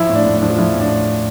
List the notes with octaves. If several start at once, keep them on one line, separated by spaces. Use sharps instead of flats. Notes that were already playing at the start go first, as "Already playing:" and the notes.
Already playing: F3 E4
A2
D4
A2
D4
F3
F4
F3 E4
A2
D4